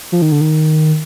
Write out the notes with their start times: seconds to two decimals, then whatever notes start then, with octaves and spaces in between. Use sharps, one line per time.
0.12 F3
0.22 D#3
0.32 D3
0.41 D#3